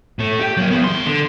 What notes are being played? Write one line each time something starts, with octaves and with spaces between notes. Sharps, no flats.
A2 A3
G4
F#3 A#3
E3 B3
E2 C6
D3